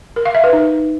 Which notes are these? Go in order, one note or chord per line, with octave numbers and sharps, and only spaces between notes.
A#4
F5
E5
B4
D#4